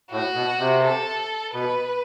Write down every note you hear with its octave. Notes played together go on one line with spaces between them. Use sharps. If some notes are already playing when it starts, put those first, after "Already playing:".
A2 F#4
B2
C3
A4
B2 B4